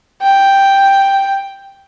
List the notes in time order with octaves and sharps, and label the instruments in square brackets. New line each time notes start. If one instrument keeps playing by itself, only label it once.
[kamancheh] G5